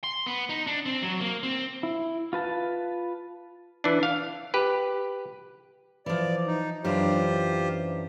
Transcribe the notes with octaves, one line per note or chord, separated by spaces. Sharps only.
C6
B3
D#4
D4
C4
F#3
A#3
C4
E4
F4 B4 A5
E3 D4
F5
G4 B4
E3 F3 D5
D#4
F#2 E3 D4 F4 G4 C5